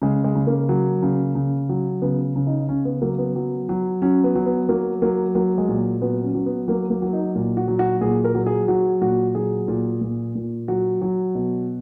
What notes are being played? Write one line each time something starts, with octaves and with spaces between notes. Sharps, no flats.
C#3 G#3
G#3
C#3
A#3
F#3
C#3
C#3
F#3
C#3 B3
C#3
D#4
C#3 C#4
B3
F#3 A#3
B3
F#3
F#3
F#3 C#4
B3
F#3
B3
F#3 A#3
F#3 A#3
F#3 A#3
G#3
A#2
F#3 B3
C#4
F#3
B3
F#3 A#3
A#3
F#3
D#4
A#2
F#4
F#3
F#4
A#2 G#4
A#4
F#3
G#4
F#3 F#4
A#2 F#4
F#3 G#4
A#2
A#2
A#2
F#3 F#4
F#3
B2